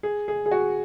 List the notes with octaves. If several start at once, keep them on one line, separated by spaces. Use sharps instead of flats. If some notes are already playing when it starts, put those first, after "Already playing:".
G#4
G#4
G#4
F#4